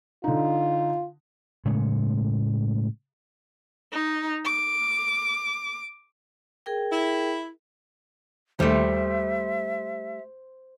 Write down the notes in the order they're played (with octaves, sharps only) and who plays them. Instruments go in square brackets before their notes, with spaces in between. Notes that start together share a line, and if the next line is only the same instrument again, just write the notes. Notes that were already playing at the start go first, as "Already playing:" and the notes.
[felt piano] D3 D#4 [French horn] F4
[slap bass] A2 C#3 G#3 A3
[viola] D#4
D6
[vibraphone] G#4 A#4 G5
[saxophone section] E4
[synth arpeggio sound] D#2 [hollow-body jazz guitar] G3 A3 [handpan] C5 [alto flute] E5